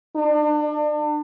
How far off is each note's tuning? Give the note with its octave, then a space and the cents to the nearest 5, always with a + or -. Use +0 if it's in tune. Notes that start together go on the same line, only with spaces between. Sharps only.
D4 +35